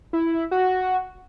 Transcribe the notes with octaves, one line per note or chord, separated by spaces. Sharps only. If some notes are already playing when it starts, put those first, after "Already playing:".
E4
F#4